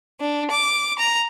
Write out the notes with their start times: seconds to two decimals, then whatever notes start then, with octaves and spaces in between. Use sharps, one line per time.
0.20 D4
0.51 D6
0.98 A#5